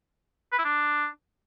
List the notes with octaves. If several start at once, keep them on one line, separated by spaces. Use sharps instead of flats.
B4
E4
D4